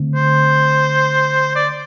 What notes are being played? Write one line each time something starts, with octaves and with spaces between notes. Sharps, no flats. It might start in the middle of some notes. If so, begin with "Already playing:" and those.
Already playing: D3 A3 C4
C5
D5